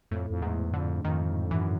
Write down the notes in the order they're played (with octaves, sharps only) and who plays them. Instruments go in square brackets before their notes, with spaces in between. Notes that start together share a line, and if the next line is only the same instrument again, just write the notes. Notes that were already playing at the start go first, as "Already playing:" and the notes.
[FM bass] F2 [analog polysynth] A2
[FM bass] F2
[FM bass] E2 [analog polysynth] G#2
[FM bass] F2 [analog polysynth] D3
[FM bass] F2 [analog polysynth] D#3
[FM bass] F#2 [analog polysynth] E3